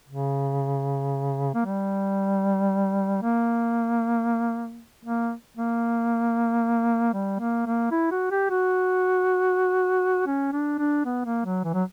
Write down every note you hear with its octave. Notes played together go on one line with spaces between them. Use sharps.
C#3
A#3
G3
A#3
A#3
A#3
G3
A#3
A#3
E4
F#4
G4
F#4
C#4
D4
D4
B3
A#3
F#3
E3
F#3